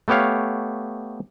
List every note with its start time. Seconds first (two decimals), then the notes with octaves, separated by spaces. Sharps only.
0.08 A3 B3 G4 C#5 F5